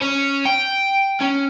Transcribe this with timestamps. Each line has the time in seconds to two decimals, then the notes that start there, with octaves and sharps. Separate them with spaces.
0.01 C#4
0.45 G5
1.21 C#4